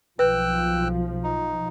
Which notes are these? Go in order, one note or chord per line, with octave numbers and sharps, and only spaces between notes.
B1 F3 B4 G5 E6 F#6
D#4